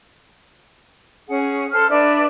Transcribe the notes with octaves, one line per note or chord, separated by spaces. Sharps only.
C#4 G#4 F#5
A4 C5 C6 F6
D4 B4 D5 E5